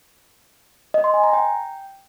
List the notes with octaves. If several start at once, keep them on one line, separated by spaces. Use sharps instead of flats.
D#5
C6
G#5
A#5
G5